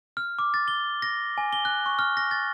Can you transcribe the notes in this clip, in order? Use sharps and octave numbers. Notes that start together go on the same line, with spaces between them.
F6
D6
A6
G7
A#6
G#5
G7
F#6
C#6
F6
A#6
A6